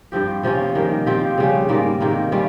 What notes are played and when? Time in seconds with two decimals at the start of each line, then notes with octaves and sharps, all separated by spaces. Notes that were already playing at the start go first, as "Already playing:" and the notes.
0.12 G2 F3 C4 G4
0.43 C3 F3 A#3 C#4
0.75 D#3 G3 A#3
1.06 F3 C4 G4
1.38 C#3 G3 C#4
1.69 G#2 G3 A#3 F4
2.00 C3 D#3 A#3
2.32 G3 C#4 F4